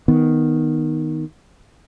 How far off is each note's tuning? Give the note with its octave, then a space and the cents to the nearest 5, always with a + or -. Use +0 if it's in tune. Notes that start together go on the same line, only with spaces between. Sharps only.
D#3 +0 B3 +0